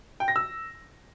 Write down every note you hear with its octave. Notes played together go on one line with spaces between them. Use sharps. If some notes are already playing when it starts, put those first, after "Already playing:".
G5
A#6
E6